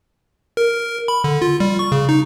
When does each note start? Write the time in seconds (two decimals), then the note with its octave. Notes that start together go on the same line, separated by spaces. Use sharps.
0.57 A#4
1.08 B5
1.24 D3
1.42 F4
1.60 G3
1.79 C#6
1.92 C#3
2.09 D#4